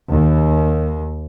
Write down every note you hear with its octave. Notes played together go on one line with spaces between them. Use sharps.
D#2